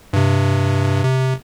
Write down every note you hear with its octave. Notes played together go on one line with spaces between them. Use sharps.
G2 C3
C3